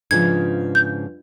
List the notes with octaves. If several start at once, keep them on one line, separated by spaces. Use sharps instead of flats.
G#2 C#3 F3 D4 F4 B4 G#6
G6